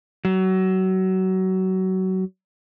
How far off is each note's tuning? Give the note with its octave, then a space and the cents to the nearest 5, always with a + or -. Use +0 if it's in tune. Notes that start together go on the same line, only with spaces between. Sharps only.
F#3 +25